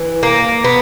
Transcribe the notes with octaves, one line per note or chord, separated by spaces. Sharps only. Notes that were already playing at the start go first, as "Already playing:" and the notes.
Already playing: E3
A#3
B3